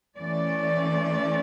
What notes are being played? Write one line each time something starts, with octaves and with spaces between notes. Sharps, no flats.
E3 A3 C#4 D5